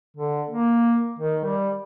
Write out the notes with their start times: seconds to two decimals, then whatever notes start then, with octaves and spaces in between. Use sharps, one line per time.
0.17 D3
0.50 A#3
1.19 D#3
1.45 G3